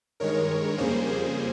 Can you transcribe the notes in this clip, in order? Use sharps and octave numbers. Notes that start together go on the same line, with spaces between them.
G2 D#3 G#3 A#4 C#5
F2 C#3 G3 A#3 G#4 C5
G#4 C5